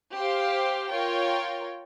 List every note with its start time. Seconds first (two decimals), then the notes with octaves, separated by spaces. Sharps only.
0.14 G4 C5 F5
0.89 F4 A#4 C#5 G5